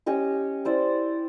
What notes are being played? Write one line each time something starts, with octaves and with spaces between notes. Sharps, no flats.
C#4 G4 D#5 C#6
E4 C5 D5